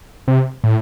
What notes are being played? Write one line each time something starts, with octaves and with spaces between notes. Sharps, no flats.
C3
A2